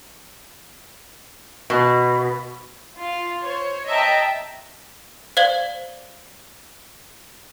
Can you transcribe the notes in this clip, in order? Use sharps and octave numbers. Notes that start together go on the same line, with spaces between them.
B2
F4
C5 C#5
D#5 E5 G5 A5 A#5
C5 D5 F5 G#6 F#7 G7